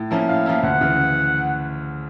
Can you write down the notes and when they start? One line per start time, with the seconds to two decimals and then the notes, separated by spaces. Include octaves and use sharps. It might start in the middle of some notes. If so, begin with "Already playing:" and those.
Already playing: A2
0.11 F3 A#3 C#4 E4
0.28 A2 F5
0.46 F3 A#3 C#4 E4
0.63 D2 F#5
0.81 C#3 E3